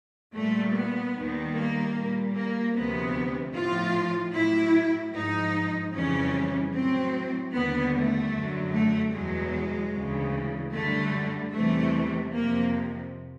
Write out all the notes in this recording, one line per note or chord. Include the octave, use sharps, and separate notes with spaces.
A#2 G3 A3
B3
D#2 D#3 G3
A#3
A#2 G3
A#3
D2 C3 F3 B3
A2 F3 F4
A2 F#3 E4
G#2 F3 D#4
F2 C#3 E3 G3 C#4
A2 F#3 C4
D#2 D3 G3 B3
A3
F#2 D3 F#3
A3
E2 B2 F#3 G#3
D2 C#3 E3
F#2 D3 G3 A3
E2 C3 E3 G3 A3
F2 C3 F3 A#3